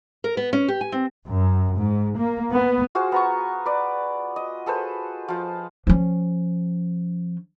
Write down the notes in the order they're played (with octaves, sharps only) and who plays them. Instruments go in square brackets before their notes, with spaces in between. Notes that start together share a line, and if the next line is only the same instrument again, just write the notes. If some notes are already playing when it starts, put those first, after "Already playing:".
[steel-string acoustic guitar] A#4
B3
C#4
G4
G#5
C4
[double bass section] F#2
G#2
A#3
B3
[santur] F4 F#4 G#4 C5
B3 A#5 C#6
B4 D5
D#5
G#4 A4 B4 C5
F3 F4
[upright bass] F3 C#4